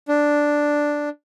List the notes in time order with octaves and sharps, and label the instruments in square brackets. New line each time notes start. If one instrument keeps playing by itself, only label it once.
[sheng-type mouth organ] D4